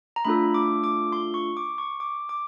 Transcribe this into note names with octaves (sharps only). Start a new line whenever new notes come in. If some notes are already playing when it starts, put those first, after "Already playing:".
A#5
A3 D4 F4 A4 B5
D6
D6
C6
C#6
D6
C#6
D6
D6